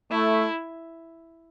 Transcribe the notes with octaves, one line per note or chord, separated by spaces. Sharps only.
A3 E4